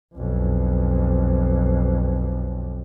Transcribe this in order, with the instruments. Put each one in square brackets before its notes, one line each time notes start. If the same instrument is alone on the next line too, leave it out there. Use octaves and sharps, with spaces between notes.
[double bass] B1 F2